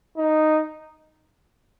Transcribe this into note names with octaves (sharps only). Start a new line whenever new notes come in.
D#4